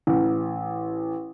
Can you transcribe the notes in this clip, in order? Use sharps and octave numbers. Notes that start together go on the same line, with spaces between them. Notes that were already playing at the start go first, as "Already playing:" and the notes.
A1